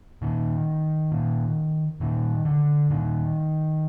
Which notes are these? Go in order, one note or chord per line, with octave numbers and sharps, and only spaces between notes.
A#2 D#3
A#2
A#2 D#3
D3
A#2 D#3